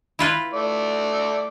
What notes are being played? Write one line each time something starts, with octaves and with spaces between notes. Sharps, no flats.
E4 F4 B4
A3 D5